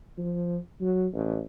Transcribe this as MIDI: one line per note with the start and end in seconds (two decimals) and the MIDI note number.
0.18 0.58 53
0.81 1.07 54
1.13 1.42 33